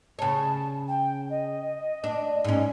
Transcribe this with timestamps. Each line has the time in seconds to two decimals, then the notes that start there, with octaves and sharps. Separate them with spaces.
0.19 C#3 C#5 A5
0.87 G5
1.29 D#5
2.04 D4
2.45 G#2 C#4